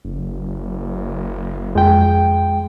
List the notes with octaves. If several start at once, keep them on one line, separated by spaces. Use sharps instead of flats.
F#1
F2 G#3 G5